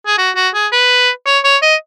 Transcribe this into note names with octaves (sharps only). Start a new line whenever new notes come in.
G#4
F#4
F#4
G#4
B4
C#5
C#5
D#5